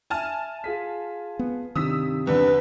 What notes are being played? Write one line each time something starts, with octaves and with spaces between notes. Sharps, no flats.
E5 G#5 A5 F6
F4 G#4 B6
B3
G2 C3 D#3 D#6 E6 B6
E2 D3 B4